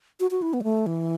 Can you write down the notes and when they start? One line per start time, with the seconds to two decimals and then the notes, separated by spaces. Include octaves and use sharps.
0.20 F#4
0.31 F#4
0.42 E4
0.53 B3
0.61 F#3
0.64 A3
0.86 E3